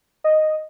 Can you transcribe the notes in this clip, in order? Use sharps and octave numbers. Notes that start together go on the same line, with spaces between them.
D#5